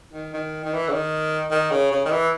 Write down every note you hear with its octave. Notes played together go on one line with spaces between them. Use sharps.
D#3
D#3
D#3
E3
C#3
D#3
D#3
C#3
C#3
D#3
E3